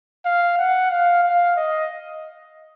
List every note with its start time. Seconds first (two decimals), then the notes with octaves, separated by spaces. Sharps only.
0.26 F5
0.59 F#5
0.91 F5
1.24 F5
1.57 D#5